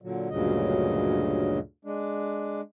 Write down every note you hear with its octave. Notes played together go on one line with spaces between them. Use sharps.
A#2 D3 F#3
D2 G2 A#2 C#3 F#3 D#5
G#3 D4